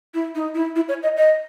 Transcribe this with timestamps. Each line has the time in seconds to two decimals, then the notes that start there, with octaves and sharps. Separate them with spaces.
0.14 E4
0.35 D#4
0.55 E4
0.76 E4
0.89 C#5
1.03 D#5
1.17 D#5